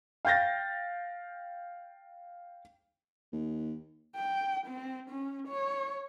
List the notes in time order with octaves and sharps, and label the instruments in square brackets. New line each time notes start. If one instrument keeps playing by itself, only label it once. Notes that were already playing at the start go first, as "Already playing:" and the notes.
[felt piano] F5 G5 G6 A6 A#6
[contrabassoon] D#2
[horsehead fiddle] G5
C4
C#4
C#5